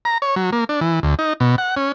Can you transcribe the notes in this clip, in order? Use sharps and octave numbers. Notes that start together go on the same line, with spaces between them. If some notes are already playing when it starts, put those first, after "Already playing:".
A#5
C#5
F#3
A#3
D4
E3
D2
D#4
B2
F#5
C#4